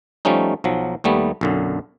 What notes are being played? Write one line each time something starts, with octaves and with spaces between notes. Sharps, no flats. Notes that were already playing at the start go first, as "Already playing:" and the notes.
F3 G3 A3 C#4 D#4
B1 F3 F#3
D#2 G3 A3 B3
B1 F#2 D3